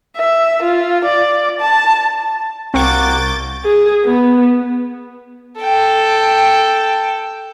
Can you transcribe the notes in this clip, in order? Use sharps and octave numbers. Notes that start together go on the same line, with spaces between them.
E5
F4
D5
A5
C2 A#3 C4 F#4 C#6 D6 G6 A6
G#4
B3
A4 G5